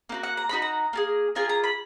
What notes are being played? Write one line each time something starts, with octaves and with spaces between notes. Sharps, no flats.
A#3 D#4 F#4
F#5
A#5
A#3 D#4 F#4 B5
A#5
A#3 F4 G#4
A#3 F4 G#4 G#5
A#5
B5